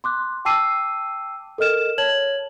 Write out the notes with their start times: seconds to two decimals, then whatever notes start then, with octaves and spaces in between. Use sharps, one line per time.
0.04 C6 D6 F#6
0.45 G5 A5 D6 E6 C7 D#7
1.58 A4 A#4 D#5 F6 E7
1.98 C#5 A5 G#6 F#7